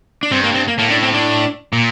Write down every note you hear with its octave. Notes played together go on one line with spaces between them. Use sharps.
D4
G2 C4
A#3
C4
A#3
A2 A#3
D4
C4
D4
A#2